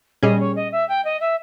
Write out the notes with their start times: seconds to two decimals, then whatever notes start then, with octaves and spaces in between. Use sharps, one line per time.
0.23 A#2 G3 C#4 G#4 D#5
0.39 C#5
0.56 D#5
0.72 E5
0.88 G5
1.04 D#5
1.20 E5